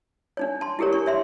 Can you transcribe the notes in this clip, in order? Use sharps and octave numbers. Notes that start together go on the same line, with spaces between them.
D4 D#4 C#5
A5 C6
E4 G4 G#4 A#4 C#5
D4 C#6
C#5 E5 C6